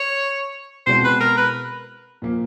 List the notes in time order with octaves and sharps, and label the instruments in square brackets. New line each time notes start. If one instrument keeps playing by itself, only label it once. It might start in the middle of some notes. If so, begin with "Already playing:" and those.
Already playing: [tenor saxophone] C#5
[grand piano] B2 G#3 C4 E4 [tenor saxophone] C5
[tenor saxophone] B4
A#4
B4
[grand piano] A#2 F3 A#3